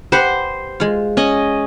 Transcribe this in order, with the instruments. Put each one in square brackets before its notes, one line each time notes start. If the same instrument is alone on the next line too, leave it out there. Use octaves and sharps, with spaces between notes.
[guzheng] G4 B4 F#5 [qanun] C5
[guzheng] G#3 F4
[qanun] C#4 D#5